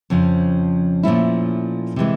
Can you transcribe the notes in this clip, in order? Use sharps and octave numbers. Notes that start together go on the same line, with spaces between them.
F2 C#3 F3
A#2 F3 A3 C#4 E4
C3 E3 G#3